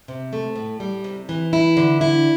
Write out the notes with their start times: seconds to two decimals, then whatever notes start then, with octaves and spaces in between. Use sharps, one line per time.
0.08 C3
0.33 A3
0.56 A2
0.80 G3
1.04 C3
1.29 E3
1.53 E4
1.77 D3
2.01 E4